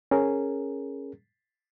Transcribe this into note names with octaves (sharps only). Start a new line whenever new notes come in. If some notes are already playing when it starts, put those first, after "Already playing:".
C#4 G#4 A#4